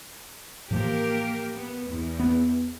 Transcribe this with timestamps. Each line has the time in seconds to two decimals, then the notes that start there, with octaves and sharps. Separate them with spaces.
0.71 A2 E3 F3 A#3 G4 A#4
1.54 B3
1.88 E2
2.20 B3